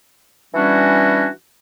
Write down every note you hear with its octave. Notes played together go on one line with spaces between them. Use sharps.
E3 G3 C#4 D4 F#4